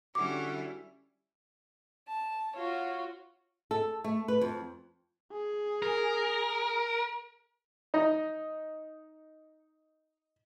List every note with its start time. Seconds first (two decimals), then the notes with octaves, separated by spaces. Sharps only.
0.15 D3 G3 C#4 E4 F#4 D6
2.08 A5
2.56 F4 F#4 C#5
3.71 A4
4.04 A3
4.28 B4
4.41 F2
5.32 G#4
5.82 A#4
7.94 D#4 D#5